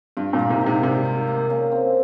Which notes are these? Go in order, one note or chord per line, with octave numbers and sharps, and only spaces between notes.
G2 F4
G2 A#2
A#3
G#2 C3
D#3
G#2 C3
G#2 C3 G3
F4
A#3
C#3
C4